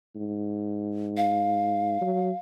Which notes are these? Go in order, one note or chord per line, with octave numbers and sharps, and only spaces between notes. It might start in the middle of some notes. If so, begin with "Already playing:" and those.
G#2
F5
F#3